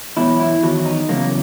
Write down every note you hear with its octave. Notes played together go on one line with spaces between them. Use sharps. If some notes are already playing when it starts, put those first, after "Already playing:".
E2 B2 F#3 E4
E4
E2 D#3 F#3 F#4
D#4
E2 C#3 F#3 A#3